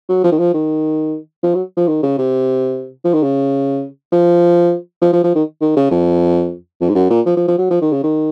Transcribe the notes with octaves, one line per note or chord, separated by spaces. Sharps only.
F#3
F3
D#3
F3
D#3
F3
F#3
F3
D#3
C#3
C3
F3
D#3
C#3
F3
F3
F3
F3
D#3
D#3
C#3
F2
F2
G#2
F#2
A#2
F3
F3
F3
F#3
F3
D#3
C#3
D#3